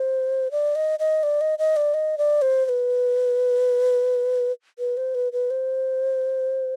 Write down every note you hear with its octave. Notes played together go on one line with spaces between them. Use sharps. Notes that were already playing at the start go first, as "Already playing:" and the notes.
Already playing: C5
D5
D#5
D#5
D5
D#5
D#5
D5
D#5
D5
C5
C5
B4
B4
C5
B4
B4
C5